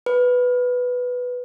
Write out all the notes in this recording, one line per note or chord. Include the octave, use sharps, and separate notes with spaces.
B4